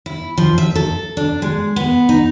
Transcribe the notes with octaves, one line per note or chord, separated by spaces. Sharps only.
E4
F3
E5
A4
D4
G#3
B3
D#4